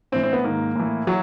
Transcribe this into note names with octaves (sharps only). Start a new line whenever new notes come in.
A2 E3 C4
C4
B3
G#2 D#3 A#3
A2 E3
E3 F#3